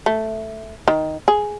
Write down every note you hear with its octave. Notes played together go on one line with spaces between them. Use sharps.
A3
D#3
G#4